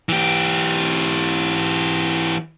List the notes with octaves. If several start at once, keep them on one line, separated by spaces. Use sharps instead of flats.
E3 G4